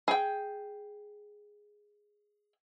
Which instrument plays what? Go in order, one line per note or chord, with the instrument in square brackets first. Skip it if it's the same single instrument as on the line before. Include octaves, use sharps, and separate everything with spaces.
[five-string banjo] G#4 G5